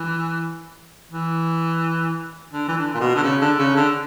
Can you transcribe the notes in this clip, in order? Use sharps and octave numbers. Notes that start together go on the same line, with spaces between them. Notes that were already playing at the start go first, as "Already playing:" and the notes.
Already playing: E3
E3
D3
E3
D3
A#2
B2
D3
C#3
D3
C#3
D3